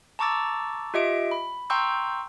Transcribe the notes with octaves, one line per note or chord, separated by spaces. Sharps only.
A5 A#5 C#6 D6 E6 A6
F4 G4 D#5 E5 D7
B5
G5 A#5 C6 C#6 E6 G6